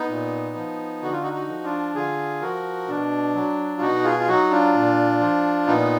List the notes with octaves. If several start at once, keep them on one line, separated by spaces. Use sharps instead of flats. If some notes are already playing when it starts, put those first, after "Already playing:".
Already playing: B3 D#4
A#2
F3
D3 F#4
F4
D#4 F#4
D#4 F#4
F3
D4 F4
D3 F4 G#4
F3 F#4 A#4
B2 D4
F#3
F4
B2 D#4 F#4
F4 G#4
F4
F#3 D#4 F#4
D4 F4
A#2
F3
A#2 B3 D#4